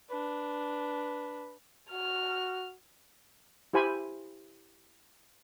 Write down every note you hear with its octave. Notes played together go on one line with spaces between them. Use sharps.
D4 B4
F#4 F6
E4 G4 C5 G#5 B5